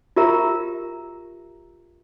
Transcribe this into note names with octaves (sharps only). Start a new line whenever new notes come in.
F4 G4 A#4 E5 A#5